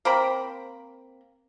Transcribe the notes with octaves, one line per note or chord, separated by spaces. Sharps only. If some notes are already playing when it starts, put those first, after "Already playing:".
A#3 C4 A#5 B5